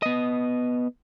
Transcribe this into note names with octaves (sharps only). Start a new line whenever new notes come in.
B3 D#5